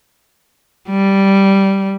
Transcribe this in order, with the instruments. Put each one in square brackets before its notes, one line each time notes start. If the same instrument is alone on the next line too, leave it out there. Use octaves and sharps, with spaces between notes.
[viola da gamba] G3